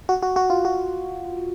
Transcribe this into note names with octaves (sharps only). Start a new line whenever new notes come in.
F#4
F#4
F#4
F4
F#4